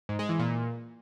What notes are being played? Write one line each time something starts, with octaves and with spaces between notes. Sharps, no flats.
G#2
G#3
E3
A#2